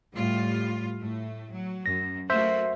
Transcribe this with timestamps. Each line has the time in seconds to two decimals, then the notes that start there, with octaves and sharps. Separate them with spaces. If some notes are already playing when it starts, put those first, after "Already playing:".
0.14 A2 G3 F4
1.00 A2 A3
1.51 F#3
1.86 F#2 A#6
2.30 A3 A#3 F#4 C5 E5